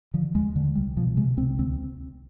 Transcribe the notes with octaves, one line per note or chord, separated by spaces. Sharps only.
D3 F3
D#2 G#3
D3
C2 G3
B2 F3
C3 G#3
C2 C4
D2 C4